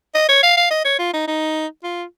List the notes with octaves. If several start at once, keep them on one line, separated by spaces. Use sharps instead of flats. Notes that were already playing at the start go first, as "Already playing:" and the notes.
D#5
C#5
F5
F5
D#5
C#5
F4
D#4
D#4
F4